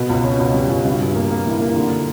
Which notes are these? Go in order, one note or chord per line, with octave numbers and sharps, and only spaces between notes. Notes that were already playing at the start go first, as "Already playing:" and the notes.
Already playing: B2
C#2
C#4
C#2
G3
C#2
G2
G2
A#3
A#3
E3
A#3
D3